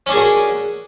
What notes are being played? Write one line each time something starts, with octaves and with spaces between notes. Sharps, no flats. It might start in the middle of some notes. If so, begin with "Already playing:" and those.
C#4 D4 F#4 G#4 A#4